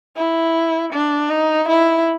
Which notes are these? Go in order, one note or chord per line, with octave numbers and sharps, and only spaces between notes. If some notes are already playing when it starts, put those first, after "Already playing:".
E4
D4
D#4
E4